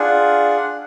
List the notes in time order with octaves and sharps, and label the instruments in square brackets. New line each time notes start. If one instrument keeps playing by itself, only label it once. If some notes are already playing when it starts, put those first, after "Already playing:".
Already playing: [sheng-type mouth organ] D4 F4 G#4 F#5